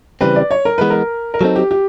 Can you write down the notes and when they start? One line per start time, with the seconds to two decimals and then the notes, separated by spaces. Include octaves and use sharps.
0.21 C#3 E3 G3 C4 B4
0.36 D5
0.51 C#5
0.65 A#4
0.78 E3 G#3 B3 B4
0.90 A#4
1.34 A#4
1.41 F#3 A3 C4 D#4 A4
1.56 G4
1.71 G4